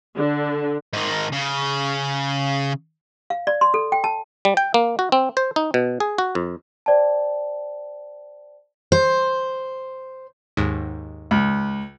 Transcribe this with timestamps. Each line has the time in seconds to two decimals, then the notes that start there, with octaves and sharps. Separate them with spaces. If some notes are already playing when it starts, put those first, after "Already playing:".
0.17 D3
0.93 G#2 D#3
1.33 C#3
3.30 F5
3.47 D5
3.61 C6
3.74 A4
3.92 G5
4.04 A5
4.45 G3
4.57 G5
4.74 A#3
4.99 F#4
5.12 C4
5.37 C5
5.56 D#4
5.74 B2
6.00 G#4
6.18 F#4
6.35 F2
6.86 C5 D5 G5 A5
8.92 C5
10.57 D#2 G#2
11.31 C#2